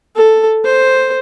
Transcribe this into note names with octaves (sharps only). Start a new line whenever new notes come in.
A4
C5